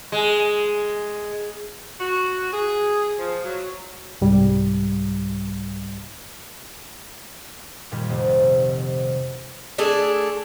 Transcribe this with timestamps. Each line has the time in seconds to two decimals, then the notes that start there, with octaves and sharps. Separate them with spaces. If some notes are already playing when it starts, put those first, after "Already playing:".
0.12 G#3
2.00 F#4
2.52 G#4
3.19 F3
3.44 F#3
4.21 C2 G#2 G3
7.92 A#2 D#3 G3
8.09 F1 C3
9.78 A3 D4 G#4 A4